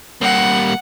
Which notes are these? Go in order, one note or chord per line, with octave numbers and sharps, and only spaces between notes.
G3 A#3 F#5